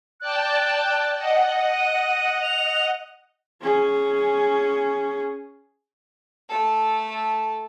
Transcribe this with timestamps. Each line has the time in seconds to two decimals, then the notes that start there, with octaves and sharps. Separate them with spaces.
0.20 D5 G5 A5 F#6
1.18 D#5 F#5
1.72 D#7
2.42 F7
3.62 C#4 G#4
6.49 A3 A4